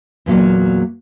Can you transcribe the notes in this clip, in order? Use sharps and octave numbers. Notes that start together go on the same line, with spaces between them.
E2 A#2 F#3 A#3